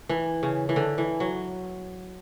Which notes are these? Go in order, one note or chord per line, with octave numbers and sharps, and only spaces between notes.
E3
C#3
E3
D3
E3
F#3